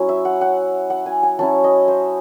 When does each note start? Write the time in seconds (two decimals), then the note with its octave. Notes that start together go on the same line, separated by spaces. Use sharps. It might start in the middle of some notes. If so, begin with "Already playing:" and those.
Already playing: F#3 C#4 E4
0.09 E5
0.25 F#5
0.41 F#5
0.90 F#5
1.06 G#5
1.23 G#5
1.39 F#3 C#4 E4 A5
1.64 D#5
1.88 C5